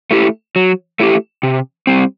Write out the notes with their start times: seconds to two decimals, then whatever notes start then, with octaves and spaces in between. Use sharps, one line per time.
0.11 A3 E4 G4
0.56 F#3
1.00 A3 E4 G4
1.43 C3
1.87 G3 C4